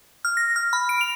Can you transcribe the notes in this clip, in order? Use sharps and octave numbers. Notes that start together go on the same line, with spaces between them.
F6
A#6
F6
B5
D7
F7